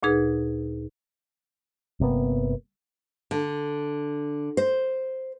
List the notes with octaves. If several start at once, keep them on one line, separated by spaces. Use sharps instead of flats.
D2 A#2 D#4 G#4 B4
G1 C3 A#3 B3
D3
C5